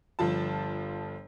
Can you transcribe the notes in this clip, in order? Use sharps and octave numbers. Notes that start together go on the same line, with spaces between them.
G1 F3 A5